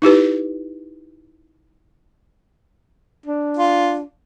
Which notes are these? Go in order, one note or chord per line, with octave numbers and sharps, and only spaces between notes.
D#4 E4 G4 B4
D4
F4